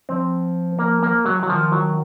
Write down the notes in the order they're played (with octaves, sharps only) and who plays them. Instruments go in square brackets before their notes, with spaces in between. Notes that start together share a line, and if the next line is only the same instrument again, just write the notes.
[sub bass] F3 [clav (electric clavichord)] C4
[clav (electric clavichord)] A#3
A#3
F#3
F#3
[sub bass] D#3 [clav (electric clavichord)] F3
[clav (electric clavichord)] F#3